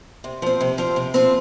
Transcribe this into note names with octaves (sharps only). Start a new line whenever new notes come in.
C3
F3 C4
C3
F3 C4
C3
F3 C4